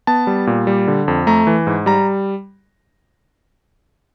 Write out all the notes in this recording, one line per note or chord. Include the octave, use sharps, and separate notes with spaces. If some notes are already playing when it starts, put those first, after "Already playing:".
B3 A5
G3
A#2
G3
D3
F2
A3 A#5
E3
G#2
G3 A#5